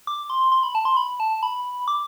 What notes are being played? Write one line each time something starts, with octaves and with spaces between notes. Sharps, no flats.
D6
C6
C6
B5
A5
C6
B5
A5
B5
D6